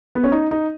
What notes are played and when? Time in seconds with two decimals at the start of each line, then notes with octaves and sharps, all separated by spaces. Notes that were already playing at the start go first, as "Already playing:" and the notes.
0.15 B3
0.24 C#4
0.32 D#4
0.51 D#4